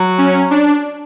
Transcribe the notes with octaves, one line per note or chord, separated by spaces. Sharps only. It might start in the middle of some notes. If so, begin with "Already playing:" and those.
Already playing: F#3
C#4
D4